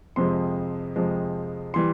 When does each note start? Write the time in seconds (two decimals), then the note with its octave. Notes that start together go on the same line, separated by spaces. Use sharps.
0.16 F2 C3 F3 G#3 C6
0.96 F2 C3 F3 G#3
1.74 E3 G3 C6